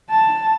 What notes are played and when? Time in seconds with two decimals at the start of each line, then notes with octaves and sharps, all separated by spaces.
0.11 A5